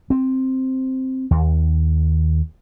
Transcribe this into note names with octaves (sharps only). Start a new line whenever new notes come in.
C4
D#2